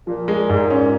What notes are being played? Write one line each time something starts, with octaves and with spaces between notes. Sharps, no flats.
A#2 F3
G#3
G#2
C#4